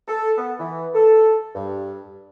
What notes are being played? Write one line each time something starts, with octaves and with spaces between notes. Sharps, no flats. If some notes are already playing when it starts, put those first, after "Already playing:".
A4
B3
E3
A4
G2